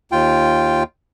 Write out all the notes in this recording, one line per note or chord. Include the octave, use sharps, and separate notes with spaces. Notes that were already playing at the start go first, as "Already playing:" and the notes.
D#2 F4 G5